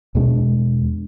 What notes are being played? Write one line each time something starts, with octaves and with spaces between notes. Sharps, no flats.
E2 B2 G#3 D4